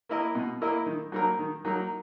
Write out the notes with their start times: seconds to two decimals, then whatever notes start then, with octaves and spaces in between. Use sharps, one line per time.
0.09 A#3 E4 A#4 D#5
0.35 B2
0.61 A#3 E4 A#4 D#5
0.86 D#3
1.12 F#3 A#3 D#4 A#4
1.39 D#3
1.65 F#3 A#3 D#4 A#4